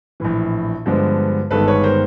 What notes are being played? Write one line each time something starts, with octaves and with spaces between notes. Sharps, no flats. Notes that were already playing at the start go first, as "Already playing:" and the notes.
A#1 A2 E3
G2 D3 F3 G#3 B3
G1 G2 D#3 G#3 B3 A4 B4
B4 C#5
A#4 C5